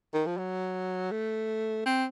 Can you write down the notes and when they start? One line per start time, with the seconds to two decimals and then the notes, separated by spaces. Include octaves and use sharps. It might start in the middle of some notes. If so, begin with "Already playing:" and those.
0.14 D#3
0.26 F3
0.37 F#3
1.11 A3
1.86 C4